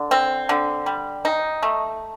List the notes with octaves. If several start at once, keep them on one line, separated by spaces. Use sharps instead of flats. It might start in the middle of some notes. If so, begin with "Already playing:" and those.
Already playing: D3
C4
D3
G3
D#4
A3